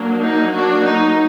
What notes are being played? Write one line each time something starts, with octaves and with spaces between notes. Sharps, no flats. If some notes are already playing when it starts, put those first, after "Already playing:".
Already playing: F#3 A#3 D4
D#4
D4 F#4
D#4